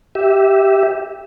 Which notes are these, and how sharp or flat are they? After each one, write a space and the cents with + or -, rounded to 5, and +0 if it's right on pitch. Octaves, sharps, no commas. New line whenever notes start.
G4 -5 E5 -10